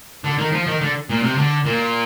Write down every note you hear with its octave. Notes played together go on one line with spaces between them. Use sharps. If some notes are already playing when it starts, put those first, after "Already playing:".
D3
D#3
F3
D#3
D3
A#2
C3
D3
A#2